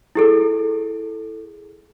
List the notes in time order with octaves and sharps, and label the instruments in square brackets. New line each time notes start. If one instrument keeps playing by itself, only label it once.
[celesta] E4 G#4 A4